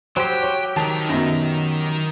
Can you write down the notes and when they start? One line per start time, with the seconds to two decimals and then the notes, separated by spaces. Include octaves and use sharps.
0.17 F#3 G4 C5 G5
0.43 C#5
0.77 D#3 A5
1.09 F#2 B2